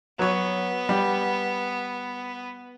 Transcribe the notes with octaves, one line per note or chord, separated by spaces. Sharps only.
F#3 B3 C#5
G3